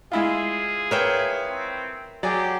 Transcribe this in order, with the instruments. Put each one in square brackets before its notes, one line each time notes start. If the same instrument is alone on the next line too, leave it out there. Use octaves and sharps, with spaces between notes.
[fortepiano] G#3 E4 F4 [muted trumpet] G#4
[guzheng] A#4 E5 G5 [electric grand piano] B4 C#5
[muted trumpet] C4
[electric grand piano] F#3 [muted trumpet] G4 [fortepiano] G#4 D5